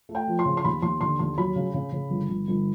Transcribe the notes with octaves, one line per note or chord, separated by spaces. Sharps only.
A3
G5
F3
C6
C#3
C6
D#2 B5
D#2 C6
D3 C6
D#2 C6
F#3 B5
C#3
C#3
C#3
G1
G1
G1